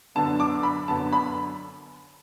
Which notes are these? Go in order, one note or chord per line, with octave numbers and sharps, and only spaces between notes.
F#2 D3 B3 A5
D6
B5
F#2 D3 B3 A5
B5